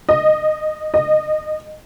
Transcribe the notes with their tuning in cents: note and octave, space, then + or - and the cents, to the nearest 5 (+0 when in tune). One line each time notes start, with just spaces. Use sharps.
D#5 -10
D#5 -15